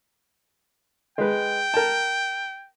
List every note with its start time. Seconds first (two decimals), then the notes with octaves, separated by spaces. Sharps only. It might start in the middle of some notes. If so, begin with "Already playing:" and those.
1.18 G#3 B4 G5
1.74 A#4 A5